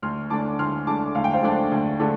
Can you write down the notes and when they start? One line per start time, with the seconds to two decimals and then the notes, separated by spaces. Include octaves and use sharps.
0.02 D2 C6 F6
0.30 D3 A3 D4 A5 D6
0.59 D2 C6 F6
0.87 D3 A3 D4 A5 D6
1.15 D2 F5
1.24 G5
1.33 C5 F5
1.43 D3 A3 D4 D5
1.71 D2
1.99 D3 A3 D4